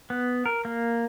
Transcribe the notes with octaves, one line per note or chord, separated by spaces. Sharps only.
B3
A#4
A#3